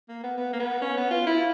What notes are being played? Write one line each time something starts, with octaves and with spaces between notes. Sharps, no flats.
A#3
B3
B3
A#3
B3
C#4
B3
F4
E4